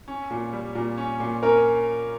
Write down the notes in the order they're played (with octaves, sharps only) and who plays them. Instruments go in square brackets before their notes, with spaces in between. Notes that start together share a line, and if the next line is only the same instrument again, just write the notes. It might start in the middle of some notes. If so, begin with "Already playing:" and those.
[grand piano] C#4
A#2
G3
A#2
C#4
A#2
[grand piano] C#4 [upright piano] A#4